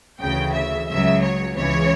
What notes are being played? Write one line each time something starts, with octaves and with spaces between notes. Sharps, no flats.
D2 C#3 E3 G5
E5
C#2 C#3 F#3 E5
C#5
C#2 C#3 E3 C#5